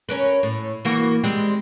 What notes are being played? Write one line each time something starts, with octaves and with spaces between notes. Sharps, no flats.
C#4 A#4 B4
A2
E3 A#3 F#4
G3 G#3 C4